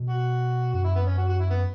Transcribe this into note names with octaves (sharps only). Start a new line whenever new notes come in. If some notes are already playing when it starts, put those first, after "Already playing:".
Already playing: B2
F#4
F#2 F#4
E4
B3
C#4
F#4
F#4
E4
B3